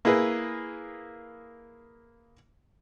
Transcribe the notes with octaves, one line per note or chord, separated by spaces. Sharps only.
A#3 E4 G#4 B4